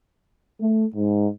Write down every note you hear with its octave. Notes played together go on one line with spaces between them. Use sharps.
A3
G#2